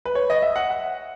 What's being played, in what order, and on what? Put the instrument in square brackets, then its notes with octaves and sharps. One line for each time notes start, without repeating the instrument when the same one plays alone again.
[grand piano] B4
C#5
D#5
E5
F#5
F#5